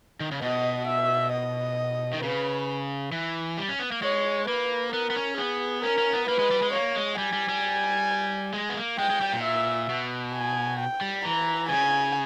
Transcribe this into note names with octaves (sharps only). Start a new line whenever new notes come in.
D#3
C#3
B2 D#5
E5
D#5
D#3
C#3 B4
E3
G3
C#4
B3
A#3
G#3 C#5
A#3 B4
B3 A#4
B3
C#4
B3 G#4
C#4 A#4
C#4
B3
A#3 B4
G#3
G3
G#3
A#3 C#5
G#3
G3 G#5
G3
G3
G#3
B3
A#3
G#3 G5
G#3
G3
A#2
E5
B2
G#5
G5
G3
E3 A#5
C#3 G#5